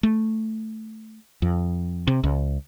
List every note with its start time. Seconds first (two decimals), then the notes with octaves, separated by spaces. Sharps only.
0.03 A3
1.42 F2
2.07 C3
2.24 C#2